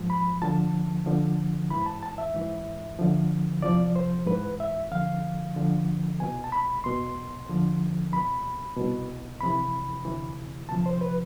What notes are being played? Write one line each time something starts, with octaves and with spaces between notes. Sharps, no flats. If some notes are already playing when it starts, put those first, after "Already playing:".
Already playing: G#2 F3
B5
D2 D3 F3 A5
F2 D3 F3
G#2 E3 B5
A5
A5
E5
G#2 E3
D2 D3 F3
E2 C3 F3 D5
C5
G#2 E3 B4
E5
F2 D3 F3 F5
D2 D3 F3
C2 B2 G#5
A5
B5
E2 B2 C6
E2 D3 F3
C2 B2 B5
C2 B2
F2 C3 E3 B5
D2 C3 E3
D2 C3 F3 A5
C5
B4